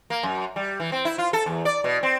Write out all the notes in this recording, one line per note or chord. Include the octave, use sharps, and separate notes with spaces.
A#3
F#2
G3
E3
C4
E4
F4
A4
E2
D5
B2
C4